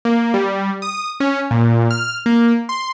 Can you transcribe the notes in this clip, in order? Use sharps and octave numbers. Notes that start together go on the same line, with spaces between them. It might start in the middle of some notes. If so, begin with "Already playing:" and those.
A#3
G3
D#6
C#4
A#2
F6
A#3
C6